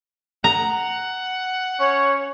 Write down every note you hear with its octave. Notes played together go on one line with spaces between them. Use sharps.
F#5 A#5
C#4 C#5